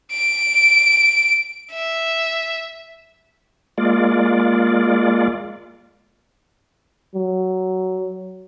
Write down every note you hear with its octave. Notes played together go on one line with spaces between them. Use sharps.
D7
E5
G#3 A#3 F4 D5
F#3